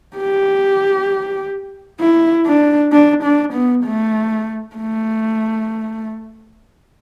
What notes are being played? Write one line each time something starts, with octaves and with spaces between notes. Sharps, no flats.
G4
E4
D4
D4
D4
B3
A3
A3